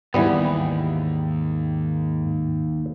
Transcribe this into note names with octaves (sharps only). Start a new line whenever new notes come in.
D#2 G#2 E3 G3 B3